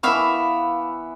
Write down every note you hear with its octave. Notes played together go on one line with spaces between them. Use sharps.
E3 B3 E5 F5 C#6